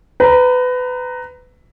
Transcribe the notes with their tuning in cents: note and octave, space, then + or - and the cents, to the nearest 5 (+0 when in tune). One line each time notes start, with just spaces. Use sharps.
B4 +25 A#5 +0